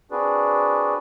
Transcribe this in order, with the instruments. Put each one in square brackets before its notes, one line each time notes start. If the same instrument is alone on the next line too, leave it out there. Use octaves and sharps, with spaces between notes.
[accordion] C4 D4 F#4 G#4 B4 D5